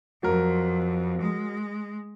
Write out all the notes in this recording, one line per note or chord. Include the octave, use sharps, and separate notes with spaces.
F2 F#3 A#4
G#3